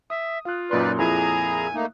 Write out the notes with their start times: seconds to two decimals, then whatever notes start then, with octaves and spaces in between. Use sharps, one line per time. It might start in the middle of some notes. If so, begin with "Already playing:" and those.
0.10 E5 D#6
0.45 F4 F5 F#6
0.71 F#2 A#2 D#4 B4 D5 C6
0.98 F2 A#2 E4 G#4 G#5 A#5
1.74 A3 A#3 D#4